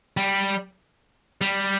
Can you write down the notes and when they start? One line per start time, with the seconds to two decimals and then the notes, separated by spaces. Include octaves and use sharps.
0.17 G3
1.41 G3